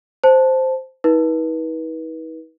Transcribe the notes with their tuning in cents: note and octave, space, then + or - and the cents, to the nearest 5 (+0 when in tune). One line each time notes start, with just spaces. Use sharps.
C5 +0 A5 +0
D#4 +45 B4 -30